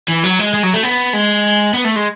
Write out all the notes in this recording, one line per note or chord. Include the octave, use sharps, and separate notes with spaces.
E3
F#3
G#3
G#3
F#3
A3
B3
G#3
B3
A3
G#3